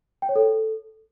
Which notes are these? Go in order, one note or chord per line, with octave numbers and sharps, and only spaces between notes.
G5
C#5
A4